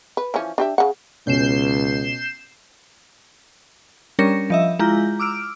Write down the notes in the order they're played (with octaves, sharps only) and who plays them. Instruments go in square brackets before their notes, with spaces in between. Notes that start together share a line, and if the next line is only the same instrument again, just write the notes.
[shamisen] B4
E3 F3 C#4
D4 G4 E5
C#3 F#5
[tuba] C#2 [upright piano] B2 C#4 [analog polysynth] G6 C7 E7
[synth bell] G3 C#4 D4 A#4 A#6 C#7
F3 D#5 E5
G#3 E4 F4 A#5 G6
D6 E6 F6 D7